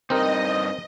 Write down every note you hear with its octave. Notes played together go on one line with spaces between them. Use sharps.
G2 C#3 C4 D#4 G4 A#4 D#5